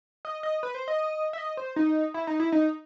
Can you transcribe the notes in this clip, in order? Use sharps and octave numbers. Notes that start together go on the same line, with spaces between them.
D#5
D#5
B4
C5
D#5
E5
D#5
C5
D#4
E4
D#4
E4
D#4